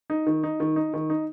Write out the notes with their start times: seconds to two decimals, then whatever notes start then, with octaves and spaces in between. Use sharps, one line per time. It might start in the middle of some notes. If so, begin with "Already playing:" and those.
0.10 D#4
0.27 D#3
0.44 D#4
0.60 D#3
0.76 D#4
0.94 D#3
1.10 D#4